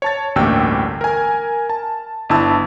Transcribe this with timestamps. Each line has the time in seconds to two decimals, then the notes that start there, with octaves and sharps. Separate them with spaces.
0.02 C#5 A5 A6
0.36 A1 D2 G2 A#3 G5 E6
1.01 A#4 G#5
1.70 A5
2.29 G1 D4 E4 A5 E6